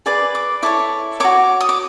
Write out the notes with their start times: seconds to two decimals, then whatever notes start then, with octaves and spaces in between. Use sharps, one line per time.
0.06 G#4 B4 D5 D6
0.35 D6
0.62 E4 A4 C#5 D6
1.20 F#4 A4 C#5 D6
1.61 D#6
1.69 D6